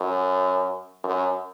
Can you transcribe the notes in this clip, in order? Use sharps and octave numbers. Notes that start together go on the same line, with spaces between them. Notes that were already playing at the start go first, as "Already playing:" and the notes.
Already playing: F#2
F#2